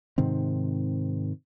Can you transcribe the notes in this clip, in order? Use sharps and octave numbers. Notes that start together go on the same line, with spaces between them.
G#2 C3 D#3 C4